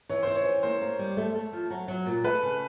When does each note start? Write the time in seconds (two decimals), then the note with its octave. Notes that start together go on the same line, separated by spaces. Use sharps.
0.09 E3 C#5
0.23 E3 C5
0.35 C#5
0.45 E3
0.63 A#3 C5
0.81 A#3
0.99 G3
1.17 A3
1.35 A3
1.53 F3
1.70 F#3
1.88 F#3
2.06 A#2
2.24 A3 B4
2.43 C#3